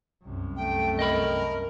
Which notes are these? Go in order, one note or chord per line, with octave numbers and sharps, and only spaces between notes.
C2 F#2
A3 G5
A#4 D#5 G5 B5